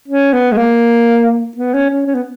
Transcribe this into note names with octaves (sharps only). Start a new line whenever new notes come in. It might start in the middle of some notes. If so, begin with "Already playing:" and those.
C#4
B3
G#3
A#3
B3
C#4
C#4
C#4
B3